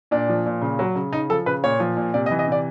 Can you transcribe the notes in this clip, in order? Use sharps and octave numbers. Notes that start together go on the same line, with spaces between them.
A#2 D4
F3
A#2
C#3
F#3
C#3
C#3 D#4
F3 A4
C#3 B4
A#2 C#5
F3
A#2
C3 D5
D#5
E3
D#5
C3 D5